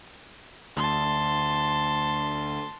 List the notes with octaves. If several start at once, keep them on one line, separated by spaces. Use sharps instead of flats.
D2 A5 C6